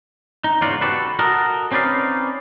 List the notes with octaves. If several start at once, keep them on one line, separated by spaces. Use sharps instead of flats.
D#4
E2 G#2 C#3 F4 F#4 D5
F#4 G4 A4 B4
F#4 A4 A#4 D#5
C4 C#4 D#4 B4 D5 F5